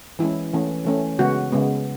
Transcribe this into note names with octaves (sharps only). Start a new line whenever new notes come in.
E3 G#3 C#4 E4
E3 A3 C#4
E3 A3 C#4
C#3 G#3 B3 F#4
C#3 G#3 B3